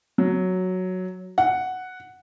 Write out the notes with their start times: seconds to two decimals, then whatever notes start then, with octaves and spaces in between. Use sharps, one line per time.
0.18 F#3
1.38 F#5